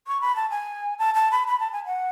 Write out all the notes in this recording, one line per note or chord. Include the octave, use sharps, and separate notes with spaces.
C#6
B5
A5
G#5
A5
A5
B5
B5
A5
G#5
F#5